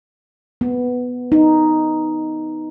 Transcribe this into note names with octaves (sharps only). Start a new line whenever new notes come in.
B3
D#4